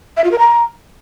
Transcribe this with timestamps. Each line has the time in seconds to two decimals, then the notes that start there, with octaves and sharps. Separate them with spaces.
0.17 E5
0.24 F4
0.31 A#4
0.39 A#5